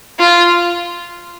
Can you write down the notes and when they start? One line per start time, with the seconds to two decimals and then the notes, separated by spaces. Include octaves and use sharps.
0.19 F4